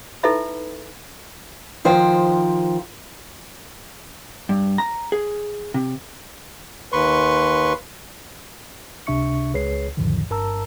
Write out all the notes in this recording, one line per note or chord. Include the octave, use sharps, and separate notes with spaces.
D#4 E4 A4 B4 E5 B5
D#3 F3 C5 G5
G2
A#5
G#4
C3
D#2 B4 C6 C#6
C#2 C3 D4 E5 C#6 C#7
C#2 G#4 B4 C#5 C7
B1 F2 A2 D3 D#3 F3
G1 G2 A#4 A5 A#5 E6